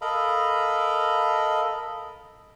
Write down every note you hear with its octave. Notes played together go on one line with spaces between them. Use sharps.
A4 A#4 D#5 F5 A#5 B5